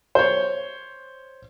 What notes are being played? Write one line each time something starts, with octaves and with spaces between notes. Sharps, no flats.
C5 C#5